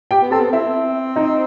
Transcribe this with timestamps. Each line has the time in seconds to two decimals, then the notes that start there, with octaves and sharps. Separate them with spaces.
0.11 G4 G5
0.22 B3
0.31 C4 A4 A5
0.40 B3
0.52 C4 E4 E5
1.16 D#4 D#5